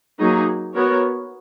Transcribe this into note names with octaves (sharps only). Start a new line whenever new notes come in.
F#3 A#3 D#4 G#4
B3 F#4 A#4 C#5